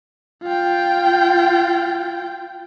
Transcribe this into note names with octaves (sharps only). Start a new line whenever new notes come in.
F4 G5